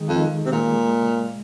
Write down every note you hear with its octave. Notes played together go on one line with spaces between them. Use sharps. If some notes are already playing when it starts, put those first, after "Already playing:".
Already playing: D#3 G#3 D#4 G#4
F2
D#3
C3 G#3
A#2
G#3
C#3